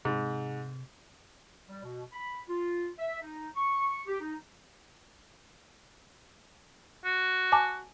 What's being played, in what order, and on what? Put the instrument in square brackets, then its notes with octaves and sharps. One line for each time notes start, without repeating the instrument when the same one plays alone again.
[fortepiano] G#2 [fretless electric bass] C3
[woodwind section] G3
B2
B5
F4
E5
D#4
C#6
G4
D#4
[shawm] F#4
[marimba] G#5 A5 D6